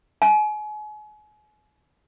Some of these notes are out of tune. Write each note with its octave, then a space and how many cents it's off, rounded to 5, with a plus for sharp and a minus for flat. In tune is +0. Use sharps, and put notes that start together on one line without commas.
G#5 +35